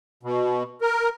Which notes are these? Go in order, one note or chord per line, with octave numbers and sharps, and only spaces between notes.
B2
A#4